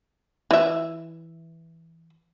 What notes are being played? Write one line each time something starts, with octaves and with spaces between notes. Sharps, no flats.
E3 E5